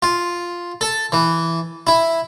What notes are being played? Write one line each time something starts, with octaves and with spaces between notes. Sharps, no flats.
F4
A4
E3
E4